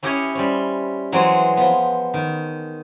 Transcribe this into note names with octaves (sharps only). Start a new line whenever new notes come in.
C#4 E4 G4 C#5 D#5
G3 C4 C#4
E3 F#3 G#3 C4 C#5
F3 B3
D#3